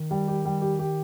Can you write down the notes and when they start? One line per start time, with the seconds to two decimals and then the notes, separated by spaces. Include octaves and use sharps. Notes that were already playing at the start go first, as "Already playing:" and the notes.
Already playing: D#3
0.11 G3
0.28 G4
0.45 G3
0.62 G4
0.79 G4